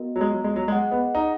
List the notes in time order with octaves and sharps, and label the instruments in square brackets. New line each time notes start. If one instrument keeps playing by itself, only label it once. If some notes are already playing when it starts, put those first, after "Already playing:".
Already playing: [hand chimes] B3 F#4 A#4 D#5
[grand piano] F#3
G#3
F#3
G#3
F#3
[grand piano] G#3 [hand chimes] G#4 D#5 F#5
[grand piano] B3
D#4